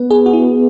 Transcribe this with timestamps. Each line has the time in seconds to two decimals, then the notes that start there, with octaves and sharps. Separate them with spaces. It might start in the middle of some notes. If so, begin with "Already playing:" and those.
Already playing: B3 B4
0.11 G#4
0.26 F#4
0.33 E4